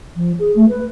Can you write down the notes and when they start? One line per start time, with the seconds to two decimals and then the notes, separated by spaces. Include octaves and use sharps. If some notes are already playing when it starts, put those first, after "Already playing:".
0.16 F3
0.39 G#4
0.55 A3
0.68 B4